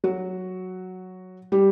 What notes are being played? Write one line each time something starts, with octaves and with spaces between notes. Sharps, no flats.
F#3 F#4
G3 G4